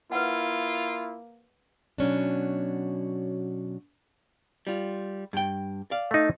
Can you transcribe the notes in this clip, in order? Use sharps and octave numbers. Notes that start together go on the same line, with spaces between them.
A#3 E4 F4 B4 F#5
B2 F#3 C#4 D4
G3 F4
G2 G5
D5 F5
A3 D#4